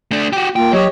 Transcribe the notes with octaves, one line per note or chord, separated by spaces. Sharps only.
A3 D4
F#4 G4
A#3 F4 G5
F#3 G4 C#5 D#5